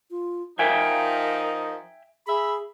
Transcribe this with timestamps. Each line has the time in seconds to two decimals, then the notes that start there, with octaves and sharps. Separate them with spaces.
0.11 F4
0.59 F3 D#4 A#4 E5 G5 G#5
2.27 G#4 E5 B5